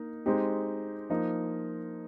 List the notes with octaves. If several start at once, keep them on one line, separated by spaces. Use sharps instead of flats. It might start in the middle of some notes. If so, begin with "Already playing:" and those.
Already playing: A#3 D#4
G#3 C4 D#4 G4
F3 A#3 D#4